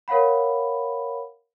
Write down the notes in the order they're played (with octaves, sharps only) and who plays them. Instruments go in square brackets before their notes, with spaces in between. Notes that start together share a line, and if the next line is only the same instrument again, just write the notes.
[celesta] A#4 C#5 F5 F#5 B5